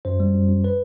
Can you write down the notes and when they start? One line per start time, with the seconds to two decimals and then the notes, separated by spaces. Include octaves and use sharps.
0.05 F#2 C5
0.20 G3
0.35 F#2
0.48 F#2
0.64 B4